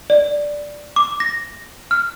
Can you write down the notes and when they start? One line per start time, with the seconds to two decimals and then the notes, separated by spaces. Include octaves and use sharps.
0.10 D5
0.96 D6
1.20 A#6
1.91 F6